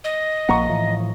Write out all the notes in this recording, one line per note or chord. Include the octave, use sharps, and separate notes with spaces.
D#5
A#1 F3 A#3 F#5 A#5 C#6
A2 E3 F3